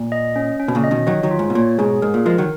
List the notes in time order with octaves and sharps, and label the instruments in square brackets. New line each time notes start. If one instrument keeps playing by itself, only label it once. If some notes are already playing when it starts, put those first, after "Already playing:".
Already playing: [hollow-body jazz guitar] A#2
[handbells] D#5
C#4
C#4
[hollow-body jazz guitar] B2
A#2 C#3
[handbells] D#5
[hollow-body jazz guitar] B2 D#3
[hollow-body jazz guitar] D#3 F#3 [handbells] C#5
[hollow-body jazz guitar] D#3 F#3
[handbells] F4
[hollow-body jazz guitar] G#2
B2
[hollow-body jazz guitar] A#2 [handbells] C#5
[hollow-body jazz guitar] G#2 B2 [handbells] G#4
[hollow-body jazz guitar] G#2 [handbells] A#4
[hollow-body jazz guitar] A#2
[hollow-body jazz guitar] F3 G#3 [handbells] A#4
[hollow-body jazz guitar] D#3 F#3